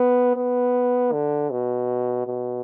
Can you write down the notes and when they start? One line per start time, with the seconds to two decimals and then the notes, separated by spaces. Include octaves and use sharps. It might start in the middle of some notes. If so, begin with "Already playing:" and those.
Already playing: B3
0.36 B3
1.12 D3
1.51 B2
2.27 B2